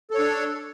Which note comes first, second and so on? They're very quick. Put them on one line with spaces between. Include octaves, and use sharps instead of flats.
A4 C#5 D4